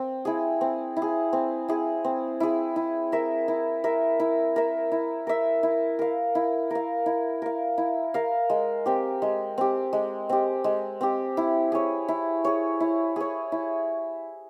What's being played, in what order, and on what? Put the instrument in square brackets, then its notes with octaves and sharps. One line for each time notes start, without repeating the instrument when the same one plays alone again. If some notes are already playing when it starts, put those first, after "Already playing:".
Already playing: [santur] C4
E4 G#4
C4
E4
G#4
C4
E4 G#4
C4
E4 G#4
E4
A#4 E5
E4
A#4 E5
E4
A#4 E5
E4
A#4 E5
E4
A#4 F5
E4
A#4 F5
E4
A#4 F5
E4
A#4 F5
G#3
C4 G4
G#3
C4 G4
G#3
C4 G4
G#3
C4 G4
E4
G#4 C#5
E4
G#4 C#5
E4
G#4 C#5
E4